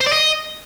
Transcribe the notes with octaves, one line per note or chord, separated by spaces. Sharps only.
C5
D5
D#5